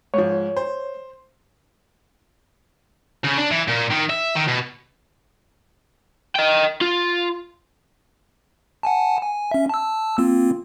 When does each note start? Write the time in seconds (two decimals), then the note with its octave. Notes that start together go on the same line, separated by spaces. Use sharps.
0.14 G#2 F3 C#5
0.56 C5
3.24 C#3
3.38 D4
3.52 E3
3.69 A#2
3.91 D#3
4.10 E5
4.35 D#3
4.48 B2
6.36 D#5 G5
6.81 F4
8.83 F#5 G#5 A5
9.22 G#5
9.51 C#4 E5
9.69 A5 E6
10.18 A#3 C4 F4